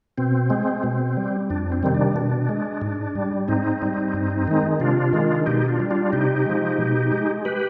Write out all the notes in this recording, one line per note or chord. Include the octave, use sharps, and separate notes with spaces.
B2 C4
G#3
B2
G3
F2 D4
C4
C3 D#3 G3
D4
B2
G#3
G#2
G3
G#2 C4 D#4
G3
G2
D#3 G#3
C3 D4 F4
D#3 G#3
B2 D#4 G4
D4 F4
G3
D4 F4
C3 D#4 G4
F3 G#3
B2
G#3
G4 B4